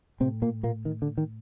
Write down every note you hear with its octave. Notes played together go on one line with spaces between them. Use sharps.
A2 C3 C4
A#2 A#3
A#2 A#3
D#3
D3
D#3